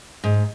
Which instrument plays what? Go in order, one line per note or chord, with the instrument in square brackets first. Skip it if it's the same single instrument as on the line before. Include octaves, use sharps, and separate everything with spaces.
[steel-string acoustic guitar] G#2